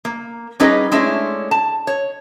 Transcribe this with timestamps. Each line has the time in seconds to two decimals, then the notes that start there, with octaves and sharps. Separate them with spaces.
0.05 A#3
0.60 G3 C#4 D#4 G#4 B4 D#5
0.92 G#3 A3 C#4 D4 E4
1.51 A5
1.87 C#5